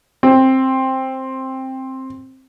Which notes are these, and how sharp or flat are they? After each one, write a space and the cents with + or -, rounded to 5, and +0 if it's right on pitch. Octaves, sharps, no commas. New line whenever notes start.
C4 +10